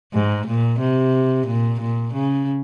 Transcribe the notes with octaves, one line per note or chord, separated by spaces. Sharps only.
G#2
A#2
C3
A#2
A#2
C#3